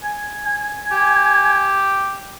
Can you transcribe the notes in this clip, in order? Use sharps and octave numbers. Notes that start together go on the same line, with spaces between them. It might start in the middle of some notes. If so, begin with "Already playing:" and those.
G#5
G#5
G4